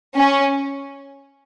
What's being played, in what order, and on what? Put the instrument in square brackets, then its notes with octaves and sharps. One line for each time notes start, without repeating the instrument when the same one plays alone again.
[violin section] C#4